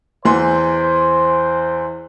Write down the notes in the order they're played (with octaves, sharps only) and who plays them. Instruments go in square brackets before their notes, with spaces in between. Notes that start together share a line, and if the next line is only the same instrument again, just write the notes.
[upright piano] E2 E3 C6 [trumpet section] C5